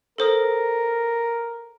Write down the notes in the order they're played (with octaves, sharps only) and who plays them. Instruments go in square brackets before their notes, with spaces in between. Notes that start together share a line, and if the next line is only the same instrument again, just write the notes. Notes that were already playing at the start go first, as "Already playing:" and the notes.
[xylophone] A4 C5 D#6 [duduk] A#4